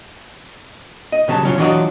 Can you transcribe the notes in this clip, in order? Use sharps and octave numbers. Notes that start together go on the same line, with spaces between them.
D#5
C2 C#3 F#3 A5
F#3 C#4 F4
E3 F#3 D4 F4 F#4 D#5